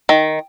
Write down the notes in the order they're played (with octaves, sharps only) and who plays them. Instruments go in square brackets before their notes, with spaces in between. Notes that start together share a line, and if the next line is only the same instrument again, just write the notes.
[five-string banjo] D#3